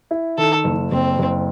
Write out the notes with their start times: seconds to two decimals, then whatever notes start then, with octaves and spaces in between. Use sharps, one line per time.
0.11 E4
0.38 D#3 A4
0.64 F#1
0.91 F#1 C4
1.19 F#1